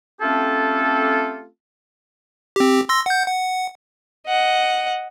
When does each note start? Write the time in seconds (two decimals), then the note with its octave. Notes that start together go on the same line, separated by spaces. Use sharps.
0.21 A3 C4 C#4 F4 G4 A4
2.56 C4 G4
2.89 C6 E6 A#6
3.06 F#5 G6
3.26 F#5
4.27 D#5 F#5